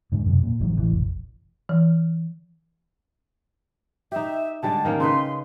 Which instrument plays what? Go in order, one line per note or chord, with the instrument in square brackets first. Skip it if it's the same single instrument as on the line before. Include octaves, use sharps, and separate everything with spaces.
[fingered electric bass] G#2 D3
F#2 C3
A#2
G#1 G#2 E3 F#3
A2 C3 E3
F1 A#1
[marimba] E3
[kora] D#4 G4 [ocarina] E5
[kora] D3 G3 G#3 [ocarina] A5
[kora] D#3 A#3 C#4
[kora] C#3 D#4 B4 [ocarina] C6